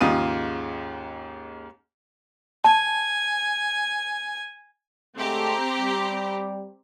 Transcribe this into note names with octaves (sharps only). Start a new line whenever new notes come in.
D#2 G#2 C#3 F4 D#6 D#7
G#5 A5
D3 G#3 A3 C4 G4 A#5
G3